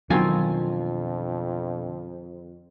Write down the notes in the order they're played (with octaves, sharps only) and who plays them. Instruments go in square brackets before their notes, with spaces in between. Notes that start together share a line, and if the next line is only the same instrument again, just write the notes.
[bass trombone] F2 [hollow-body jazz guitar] B2 D3 F4 [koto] D#3 C4 G#5 [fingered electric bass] F#3